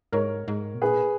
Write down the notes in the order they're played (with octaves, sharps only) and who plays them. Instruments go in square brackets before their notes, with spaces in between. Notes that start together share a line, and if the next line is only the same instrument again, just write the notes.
[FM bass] G#2 [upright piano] A#4 C#5
[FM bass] G#2
B2
[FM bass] A#2 [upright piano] G#4 B4